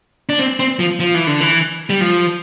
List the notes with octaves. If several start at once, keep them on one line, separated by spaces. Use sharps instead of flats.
D4
C4
C4
F3
F3
E3
D3
E3
G3
F3